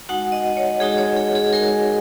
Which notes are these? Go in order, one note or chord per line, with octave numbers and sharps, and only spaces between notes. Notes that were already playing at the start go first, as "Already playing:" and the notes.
G#3 D#4 F#4 F#5
D#5
C#5
G#3 D#4 F#4 G#4
C#5
G#4
G#4
G#3 D#4 F#4 A#4